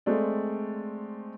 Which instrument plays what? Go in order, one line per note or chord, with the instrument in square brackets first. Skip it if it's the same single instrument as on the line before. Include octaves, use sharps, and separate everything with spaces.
[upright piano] G#3 A3 C4 D5